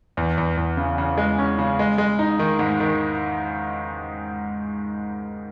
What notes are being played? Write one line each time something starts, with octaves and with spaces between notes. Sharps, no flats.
E2
E2
E2
C#3
C#3
G#3
C#4
C#3
G#3
G#3
D#4
D#3
G#2
D#3